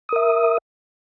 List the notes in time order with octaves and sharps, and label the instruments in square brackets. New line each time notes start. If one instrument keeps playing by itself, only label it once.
[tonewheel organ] D#6
A#4
E5